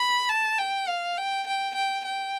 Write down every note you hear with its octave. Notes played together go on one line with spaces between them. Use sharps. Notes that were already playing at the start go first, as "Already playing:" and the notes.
Already playing: B5
A5
G5
F5
G5
G5
G5
G5